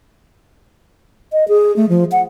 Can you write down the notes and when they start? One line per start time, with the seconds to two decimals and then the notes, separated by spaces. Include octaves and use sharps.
1.32 D#5
1.48 G#4
1.76 A3
1.89 F3
2.12 F#5